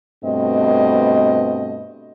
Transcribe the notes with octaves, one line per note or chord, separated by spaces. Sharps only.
G2 B2 A3 C4 D#5